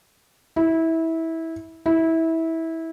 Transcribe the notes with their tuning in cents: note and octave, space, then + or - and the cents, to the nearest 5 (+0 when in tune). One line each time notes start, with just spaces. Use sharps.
E4 -20
E4 -20